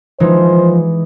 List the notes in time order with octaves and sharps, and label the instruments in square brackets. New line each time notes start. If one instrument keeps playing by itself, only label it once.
[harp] E3 G#3 D#4 [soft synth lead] F3 [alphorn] C5